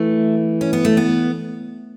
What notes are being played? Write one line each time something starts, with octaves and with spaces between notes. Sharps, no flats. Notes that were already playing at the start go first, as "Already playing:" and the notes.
Already playing: E3 A3
C#4
B3
A3
B3